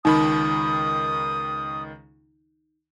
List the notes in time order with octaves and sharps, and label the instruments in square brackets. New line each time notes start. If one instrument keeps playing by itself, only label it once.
[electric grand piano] C#2 D#3 B5 [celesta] D#4 [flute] D#6